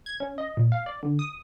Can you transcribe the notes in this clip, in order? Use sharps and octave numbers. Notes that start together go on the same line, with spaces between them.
G#6
C#4
D#5
A#2
F5
D5
D3
D#6